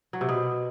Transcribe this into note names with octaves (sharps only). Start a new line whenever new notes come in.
F#3
C3
B2